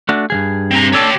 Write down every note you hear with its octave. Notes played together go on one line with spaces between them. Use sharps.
A3 D4 F#4
G2 F3 G#4
C4 A#5
D4 G4 A4 C#5